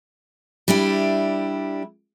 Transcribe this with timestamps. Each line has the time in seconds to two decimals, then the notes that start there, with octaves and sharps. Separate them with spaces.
0.68 G3 D4 E4 G4